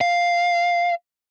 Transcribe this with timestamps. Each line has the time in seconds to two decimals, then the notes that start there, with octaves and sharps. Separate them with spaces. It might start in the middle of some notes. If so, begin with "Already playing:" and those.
0.01 F5